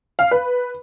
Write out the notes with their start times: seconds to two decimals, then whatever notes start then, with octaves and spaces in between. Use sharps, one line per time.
0.19 F5
0.31 B4